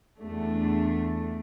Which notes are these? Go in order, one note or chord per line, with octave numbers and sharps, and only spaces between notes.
E2 A3 D4